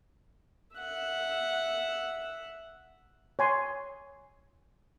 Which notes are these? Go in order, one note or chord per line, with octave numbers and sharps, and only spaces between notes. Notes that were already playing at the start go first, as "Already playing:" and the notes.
E5 F#5
C#5 G#5 C6